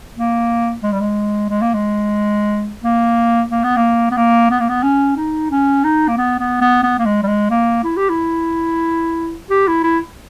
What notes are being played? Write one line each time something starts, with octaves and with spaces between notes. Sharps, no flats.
A#3
G#3
G3
G#3
G#3
A#3
G#3
A#3
A#3
B3
A#3
B3
A#3
B3
A#3
B3
C#4
D#4
C#4
D#4
A#3
B3
B3
B3
B3
A#3
G#3
G3
G#3
A#3
E4
G4
E4
G4
E4
E4